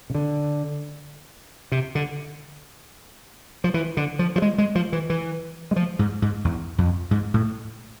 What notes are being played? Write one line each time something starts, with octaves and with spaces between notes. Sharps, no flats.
C3
D3
C3
D3
F3
E3
D3
F3
F3
G#3
G#3
F3
E3
E3
G#3
F3
G#2
G#2
E2
F2
G#2
A2